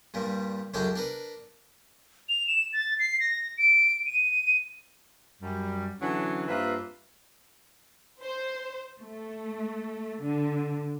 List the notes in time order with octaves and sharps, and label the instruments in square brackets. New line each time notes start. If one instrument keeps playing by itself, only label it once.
[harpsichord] G2 A#2 G3
C#2 F#2 G#3 D4 A4 G5
D4 A#4 B4
[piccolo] F7
E7
A6
C7
A#6
D7
D#7
[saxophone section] F#2 G3
D3 E3 F#3 C#4
G2 A#3 C4 F4 B4 E5
[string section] C5
A3
D3